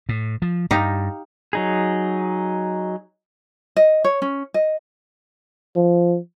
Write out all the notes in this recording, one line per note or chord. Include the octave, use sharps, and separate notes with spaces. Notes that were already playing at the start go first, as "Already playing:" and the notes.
A2
F3
G2 D#4 G4 F5
F#3 D#4 G#4
D#5
C#5
C#4
D#5
F3